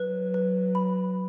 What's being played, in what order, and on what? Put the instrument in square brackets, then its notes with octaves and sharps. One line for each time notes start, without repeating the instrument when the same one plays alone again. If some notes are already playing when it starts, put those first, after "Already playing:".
Already playing: [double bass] F#3 [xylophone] B4
[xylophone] B4
B5